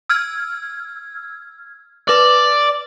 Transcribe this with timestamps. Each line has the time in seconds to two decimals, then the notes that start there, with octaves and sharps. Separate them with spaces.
0.09 E6 F6 G#6
2.09 B4 D5 F#7